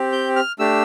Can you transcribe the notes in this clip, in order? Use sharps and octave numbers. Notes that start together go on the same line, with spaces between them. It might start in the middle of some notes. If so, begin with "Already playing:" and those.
Already playing: C4 G4
G6
F6
A3 D4 G4 E6